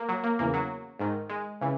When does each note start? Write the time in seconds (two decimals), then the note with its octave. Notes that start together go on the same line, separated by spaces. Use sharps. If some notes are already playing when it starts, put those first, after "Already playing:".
Already playing: A#3
0.09 F#3
0.23 A#3
0.39 E2 C#3 E3 A#3
0.54 F#3
0.99 G#2 D#3
1.29 G#3
1.61 C#3 E3